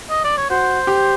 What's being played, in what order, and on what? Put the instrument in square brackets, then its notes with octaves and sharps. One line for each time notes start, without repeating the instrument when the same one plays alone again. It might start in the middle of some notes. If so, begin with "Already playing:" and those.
[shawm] D#5
D5
C#5
[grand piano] F#4 [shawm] C5
[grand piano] G4